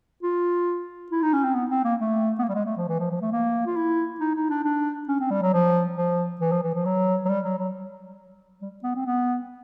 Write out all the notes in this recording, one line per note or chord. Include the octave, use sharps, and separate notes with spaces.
F4
E4
D#4
C#4
C4
B3
C4
A#3
A3
B3
A#3
G3
G#3
A3
F3
E3
F3
F3
A3
A#3
F4
E4
D#4
D#4
D4
D4
C#4
C4
G3
F#3
F3
F3
E3
F3
E3
F3
F#3
F#3
G3
F#3
F#3
G3
B3
C4
B3